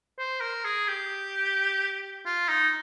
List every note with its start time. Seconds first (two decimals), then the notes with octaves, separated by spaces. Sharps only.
0.18 C5
0.41 A#4
0.64 G#4
0.88 G4
2.26 F4
2.49 D#4